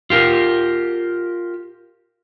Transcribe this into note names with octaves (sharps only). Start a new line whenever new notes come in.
F4 G4 A#4